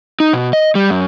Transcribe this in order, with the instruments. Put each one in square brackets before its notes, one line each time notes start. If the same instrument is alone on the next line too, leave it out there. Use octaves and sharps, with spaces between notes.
[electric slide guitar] D#4
B2
D#5
G3
F#2